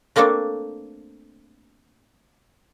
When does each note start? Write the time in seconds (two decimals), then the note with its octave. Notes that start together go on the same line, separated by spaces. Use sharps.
0.16 A3 A#3 C4 D4 A4